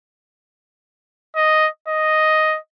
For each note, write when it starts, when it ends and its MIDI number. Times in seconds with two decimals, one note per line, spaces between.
1.36 1.68 75
1.88 2.58 75